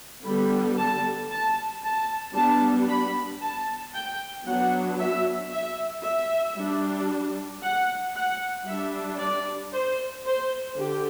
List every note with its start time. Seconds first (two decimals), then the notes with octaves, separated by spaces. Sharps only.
0.25 D3 G3 B3 B5
0.77 A5
1.30 A5
1.83 A5
2.35 G3 B3 D4 A5
2.88 B5
3.41 A5
3.94 G5
4.46 F#3 B3 D4 F#5
4.99 E5
5.51 E5
6.04 E5
6.57 G3 D4
7.63 F#5
8.15 F#5
8.67 G3 D4 E5
9.19 D5
9.73 C5
10.26 C5
10.78 D3 G4